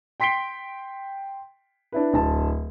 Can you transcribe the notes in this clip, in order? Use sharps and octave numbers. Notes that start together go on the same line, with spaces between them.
G5 C6 B6 C7 D7 G7
D4 E4 B4
D1 A5